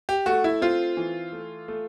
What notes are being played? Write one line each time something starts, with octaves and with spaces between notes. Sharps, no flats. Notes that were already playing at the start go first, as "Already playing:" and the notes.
G4
A3 F#4
E4
C4 F4
E3
A3
A3